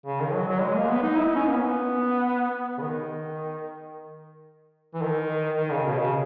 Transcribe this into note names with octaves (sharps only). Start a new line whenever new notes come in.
C#3
D#3
F#3
F#3
G#3
A#3
B3
D#4
E4
D#4
C#4
A#3
B3
C#3
D#3
E3
D#3
D#3
C#3
B2
C#3